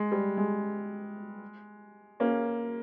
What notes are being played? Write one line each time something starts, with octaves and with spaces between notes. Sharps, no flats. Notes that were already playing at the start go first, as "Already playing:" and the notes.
Already playing: G#3
G3
G#3
A#3 C#4